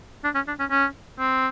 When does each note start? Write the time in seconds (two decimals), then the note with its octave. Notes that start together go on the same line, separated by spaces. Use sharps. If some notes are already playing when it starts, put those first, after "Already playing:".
0.24 D4
0.35 C#4
0.48 D4
0.60 C#4
0.71 C#4
1.19 C4